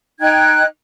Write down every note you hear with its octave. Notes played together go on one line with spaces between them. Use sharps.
D#4 G5 F#6 G#6